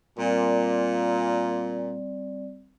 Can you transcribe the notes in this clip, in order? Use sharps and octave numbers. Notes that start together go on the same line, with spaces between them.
A#2 G3 C4 D5